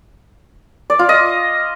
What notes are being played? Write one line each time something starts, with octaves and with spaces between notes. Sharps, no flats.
D5
F4
D#5